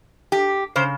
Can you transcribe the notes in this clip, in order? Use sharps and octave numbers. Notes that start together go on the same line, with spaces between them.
G4
C#3 C5